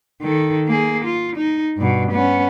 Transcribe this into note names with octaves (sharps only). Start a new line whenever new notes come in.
D#3 A4
A#3 G#4
F4
D#4
G2 B2
B3 C#4